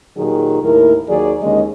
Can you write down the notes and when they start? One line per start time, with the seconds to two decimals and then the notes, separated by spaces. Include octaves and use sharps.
0.17 A#2 D#3 F#3 G4 G#4
0.63 D#2 A2 E4 A#4
1.08 D#2 F#3 G#4 D5
1.41 D#2 D3 G#3 C#4 G#4 D#5